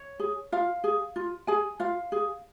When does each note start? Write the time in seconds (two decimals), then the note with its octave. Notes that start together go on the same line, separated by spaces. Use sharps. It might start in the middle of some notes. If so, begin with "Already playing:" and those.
Already playing: C#5
0.19 G#4
0.52 F4 F5
0.84 G#4
1.16 F4
1.47 G#4 G#5
1.80 F4 F5
2.12 G#4